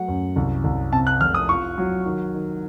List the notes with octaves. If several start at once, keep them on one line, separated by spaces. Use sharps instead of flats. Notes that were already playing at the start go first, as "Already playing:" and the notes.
Already playing: F#3 A3 F#5
F#2
C2
C2
C3 A5
F#6
F1 F6
D#6
F4 C#6
F#3
D#3
D#3